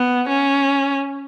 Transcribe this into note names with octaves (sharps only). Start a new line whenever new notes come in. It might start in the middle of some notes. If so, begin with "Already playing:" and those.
Already playing: B3
C#4